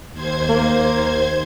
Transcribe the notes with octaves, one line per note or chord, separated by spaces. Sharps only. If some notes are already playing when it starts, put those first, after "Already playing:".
D#2 C5 G#6
A#3